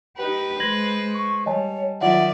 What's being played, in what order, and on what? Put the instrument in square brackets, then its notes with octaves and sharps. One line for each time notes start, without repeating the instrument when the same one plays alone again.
[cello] D#4 G4 [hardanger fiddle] B4
[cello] G#3 C5 [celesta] G#6 A#6 F#7
[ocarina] C#6
[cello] G3 [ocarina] C#5 [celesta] D#5 G#5 A5
[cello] D#3 F#3 [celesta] F4 F#5 [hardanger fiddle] D5 [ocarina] E5